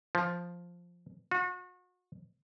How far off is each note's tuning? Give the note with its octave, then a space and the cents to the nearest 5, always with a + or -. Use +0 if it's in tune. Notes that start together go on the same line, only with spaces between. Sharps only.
F3 +0
F#4 -35